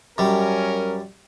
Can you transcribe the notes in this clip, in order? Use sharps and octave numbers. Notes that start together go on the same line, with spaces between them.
F#2 G3 C#4 A#4